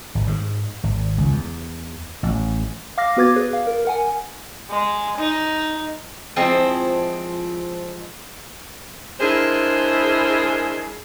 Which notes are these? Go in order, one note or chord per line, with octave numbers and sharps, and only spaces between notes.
G#1
G#2
G#1
C#2
E2
A1
F5 D6 F6 A#6
B3 F#4 B4 D6 G#6 A6
G#4 B4
F5
A#4
A#4 F#5 G#5
G#3
D#4
F3 G#3 C4 E4
G#3 D4 E4 G#4 A#4 C5